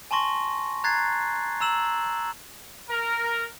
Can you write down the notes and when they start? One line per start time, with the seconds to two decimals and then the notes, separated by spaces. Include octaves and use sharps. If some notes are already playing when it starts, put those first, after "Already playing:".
0.11 G#5 A5 C6 C#6 A#6
0.84 A#5 F#6 G#6 A6 C7
1.61 A#5 E6 E7 F#7
2.90 A#4